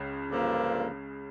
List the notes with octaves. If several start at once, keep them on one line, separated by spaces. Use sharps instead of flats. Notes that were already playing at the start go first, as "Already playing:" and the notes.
Already playing: C#2 C#3
G2 D3 F3 A#3